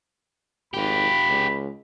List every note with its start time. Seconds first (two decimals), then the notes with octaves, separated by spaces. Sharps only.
0.74 G#1 F4 G4 B5
1.29 C#2